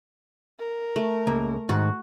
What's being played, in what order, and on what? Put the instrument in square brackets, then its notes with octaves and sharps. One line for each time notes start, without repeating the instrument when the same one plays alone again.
[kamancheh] A#4
[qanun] A3
[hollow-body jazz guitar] C#2 A#3
[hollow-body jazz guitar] G#2 D#3 [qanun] F#4